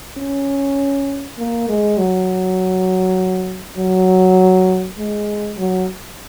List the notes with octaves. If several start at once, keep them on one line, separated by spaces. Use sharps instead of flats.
C#4
A#3
G#3
F#3
F#3
G#3
F#3